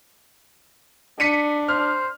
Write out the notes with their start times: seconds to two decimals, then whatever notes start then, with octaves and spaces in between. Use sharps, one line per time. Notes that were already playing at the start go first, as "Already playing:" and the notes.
1.20 D4 B6 C#7 D#7
1.68 C5 F6